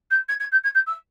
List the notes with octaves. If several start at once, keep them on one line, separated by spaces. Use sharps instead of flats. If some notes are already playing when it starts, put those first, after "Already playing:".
G6
G#6
G#6
G6
G#6
G6
E6